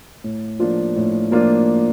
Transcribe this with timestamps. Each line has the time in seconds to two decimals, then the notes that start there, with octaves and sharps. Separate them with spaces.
0.24 A2
0.59 F3 A#3 D4 F4
0.96 A2
1.31 F3 A#3 D4 F4